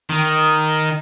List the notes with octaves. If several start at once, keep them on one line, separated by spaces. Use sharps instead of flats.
D#3